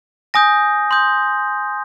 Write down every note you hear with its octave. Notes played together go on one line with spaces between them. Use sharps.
G#5 D#6 G6 A#6
C6 D#6 G6